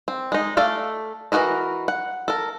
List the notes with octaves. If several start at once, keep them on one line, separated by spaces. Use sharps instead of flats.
C4
G#3 D#4
A3 A4 D5 F5
E3 F4 F#4 A#4 D#5
F#5
A4 A#4